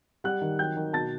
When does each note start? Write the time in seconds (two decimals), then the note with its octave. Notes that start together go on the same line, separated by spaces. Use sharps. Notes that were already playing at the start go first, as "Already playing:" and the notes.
0.24 G3 F#5 F#6
0.41 D#3
0.59 F#3 G5 G6
0.77 D#3
0.93 B2 A5 A6